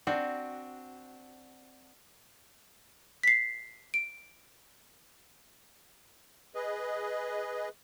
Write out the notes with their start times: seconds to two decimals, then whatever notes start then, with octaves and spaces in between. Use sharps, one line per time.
0.07 C4 D4 F#4
3.23 B6 C7
3.94 D7
6.55 G#4 B4 D#5